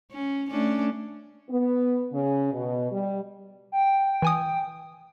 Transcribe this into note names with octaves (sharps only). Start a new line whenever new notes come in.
C#4
A3 C#4 D4
B3
C#3
B2
G3
G5
E3 G#5 D#6